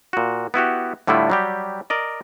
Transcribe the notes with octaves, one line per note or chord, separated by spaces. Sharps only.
A#2 F#4
B3 E4 F#4 G4
A2 D3 G3 A3 E4 F4
F#3 G3 G4
A#4 D5 D#5